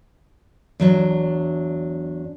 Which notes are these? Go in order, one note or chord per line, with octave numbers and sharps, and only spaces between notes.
E2 F#3 D4